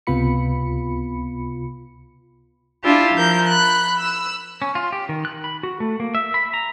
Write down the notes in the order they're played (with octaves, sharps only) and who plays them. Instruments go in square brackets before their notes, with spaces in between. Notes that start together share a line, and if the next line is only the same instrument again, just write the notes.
[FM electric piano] C#2 C3 B3 F4 B5 C#7
[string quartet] D4 E4 F4 G4
F3 A#4 G6
B5 F#6
E6
[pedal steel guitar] C#4
F4
G4
D#3
F#6
B5
F#4
A3
A#3
E5
B5
A#5